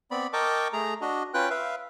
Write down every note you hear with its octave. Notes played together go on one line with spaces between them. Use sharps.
B3 C4 D5 B5
A#4 D#5 G5 A5 C#6 D6
A3 G#4 A#5
D4 F#4 D#5
C#4 F4 B4 G5 F#6
B4 E5 F5